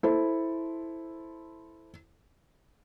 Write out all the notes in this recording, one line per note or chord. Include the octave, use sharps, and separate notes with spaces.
E4 A4 C5